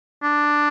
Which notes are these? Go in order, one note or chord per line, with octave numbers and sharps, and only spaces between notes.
D4